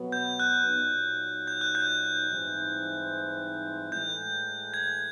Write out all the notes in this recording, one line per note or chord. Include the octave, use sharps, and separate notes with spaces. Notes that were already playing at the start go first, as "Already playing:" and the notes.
Already playing: B2 F#3 B3
G6
F#6
A#2 F#3 B3 D#4
G6
F#6
G6
G#2 E3 G3 C4 D#4
A2 E3 G#3 G6
G#6